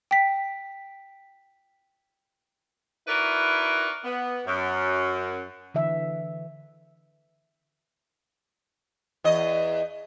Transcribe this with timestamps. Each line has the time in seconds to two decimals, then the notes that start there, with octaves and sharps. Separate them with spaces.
0.11 G5 B6
3.06 D#4 E4 F#4 A#4 B4 D5
4.03 B3
4.45 F#2
5.74 D3 E3 E5
9.24 E2 D#5